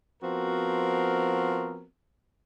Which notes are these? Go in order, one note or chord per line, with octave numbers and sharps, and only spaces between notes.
F3 B3 C4 F#4 A#4